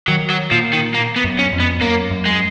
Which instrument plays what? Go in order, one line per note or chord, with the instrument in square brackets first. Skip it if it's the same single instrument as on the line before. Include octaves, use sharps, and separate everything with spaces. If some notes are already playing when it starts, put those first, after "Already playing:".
[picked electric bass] D#3 [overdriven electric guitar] F#3
[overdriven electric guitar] F#3
[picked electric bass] A#2 [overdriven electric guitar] F3
[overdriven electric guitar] D#3
A#3
B3
[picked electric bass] F#2
[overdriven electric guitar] C#4
[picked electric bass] F2
[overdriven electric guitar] B3
[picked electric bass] F#2 [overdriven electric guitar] A#3
[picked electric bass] F#2
[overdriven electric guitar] G#3